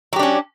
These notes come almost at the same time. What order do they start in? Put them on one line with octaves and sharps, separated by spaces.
F#3 G4 D4 C#4